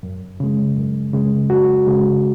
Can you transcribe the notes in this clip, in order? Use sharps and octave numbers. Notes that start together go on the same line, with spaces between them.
F#2
C#3 G#3
F#2
C#3 G#3
F#2 F#4
C#3 G#3